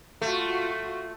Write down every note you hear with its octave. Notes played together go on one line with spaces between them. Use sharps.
A3 F4 F#4